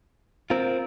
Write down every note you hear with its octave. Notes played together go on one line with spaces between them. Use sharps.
C4 F4 A#4